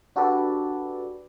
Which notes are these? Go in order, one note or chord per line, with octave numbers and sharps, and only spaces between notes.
D4 F#4 G4 A4 B4 D5